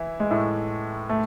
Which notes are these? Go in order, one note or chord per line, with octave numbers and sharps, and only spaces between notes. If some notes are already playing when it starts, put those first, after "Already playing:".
Already playing: E3 E4
G#3
A2 A3
A3